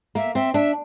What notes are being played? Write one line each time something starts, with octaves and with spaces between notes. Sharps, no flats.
A#3 E5
C4 E5
D4 E5